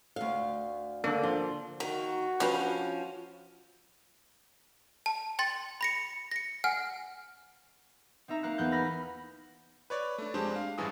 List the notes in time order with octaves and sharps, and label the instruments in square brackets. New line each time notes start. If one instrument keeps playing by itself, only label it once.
[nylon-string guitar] D2 F5
[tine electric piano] D3 A#3 [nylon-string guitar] D4
[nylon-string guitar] F3
[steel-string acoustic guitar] D#3 [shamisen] A#3 [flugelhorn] F#4
[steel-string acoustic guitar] F3 C#4 [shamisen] D4 G4 B4
[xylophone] A5
G5 C6 A6
B5 A#6 C#7
A#6 C#7
F#5 G#5 F6
[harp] C4 D#4 E5 A#5
A#3 F5 A#5 F#6 C#7
E2 B3 F#6 G6
B5 F6 A#6 B6
[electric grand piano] B4 C#5 D5
A3 D4
F2 G#3 D4 G4 C5
F5
A1 G2 E3 G#4 D#6